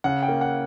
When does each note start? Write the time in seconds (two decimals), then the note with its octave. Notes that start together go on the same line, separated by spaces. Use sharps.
0.04 C#3 F#5
0.23 G5
0.29 A#3
0.41 F#5